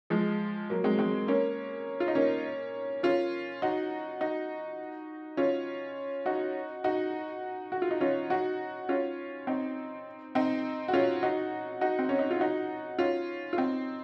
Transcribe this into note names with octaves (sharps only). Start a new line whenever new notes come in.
F3 G#3
F#3 A#3
G#3 C4
G#3 C4
A#3 C#4
F4
D#4
A#3 C#4
C#4 F4
D#4 F#4
D#4 F#4
C#4 F4
D#4 F#4
D#4 F#4
F#4
F4
D#4
C#4 F4
D#4 F#4
C#4 F4
C4 D#4
C4 D#4
F#4
C#4 F4
D#4 F#4
D#4 F#4
C4
C#4
D#4
F4
D#4 F#4
C#4 F4
F4
C4 D#4